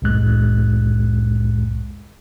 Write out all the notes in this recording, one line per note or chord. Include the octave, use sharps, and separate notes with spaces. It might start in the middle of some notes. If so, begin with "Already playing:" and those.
C2 F2 A2 G#3 F#6